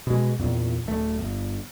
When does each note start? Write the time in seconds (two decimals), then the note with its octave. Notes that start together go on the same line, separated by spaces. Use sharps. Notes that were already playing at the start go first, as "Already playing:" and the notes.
0.07 B2 G#3
0.39 E2 A#2
0.86 D1 A3
1.19 G1